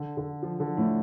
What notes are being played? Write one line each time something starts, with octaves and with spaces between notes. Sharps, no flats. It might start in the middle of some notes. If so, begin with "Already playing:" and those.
Already playing: D3
D3
F3
D3
A2